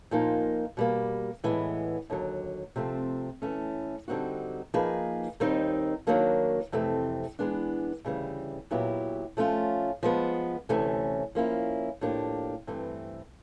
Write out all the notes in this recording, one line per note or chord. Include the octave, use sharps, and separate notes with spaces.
A#2 F3 A#3 D#4
B2 G3 A#3
A2 E3 G#3 B3
D#2 D3 F#3
C3 F3 A3 C4
E3 A3 C#4
D3 G3 C4 D#4 F#4
F3 A#3 D#4 G#4 B4
D#2 D#3 G3 C4 D#4
D#3 F#3 A#3 D4
F2 C3 E3 A3 C4
E3 G#3 B3 D4
D2 C#3 E3 G3
A#2 F#3 B3 E4 G4
F3 A3 C#4 F4
F3 G#3 B3
D2 C3 E3 A3 C#4
F3 A#3 C#4 E4
A2 F3 A#3 D4 G4
G2 E3 A3 C4